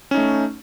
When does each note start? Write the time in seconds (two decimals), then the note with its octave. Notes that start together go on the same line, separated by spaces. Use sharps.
0.11 C#4
0.14 D#4
0.17 A3